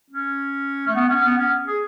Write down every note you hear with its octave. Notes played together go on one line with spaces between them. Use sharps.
C#4
A3
B3
C#4
B3
C#4
G#4